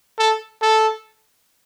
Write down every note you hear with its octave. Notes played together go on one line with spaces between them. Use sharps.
A4
A4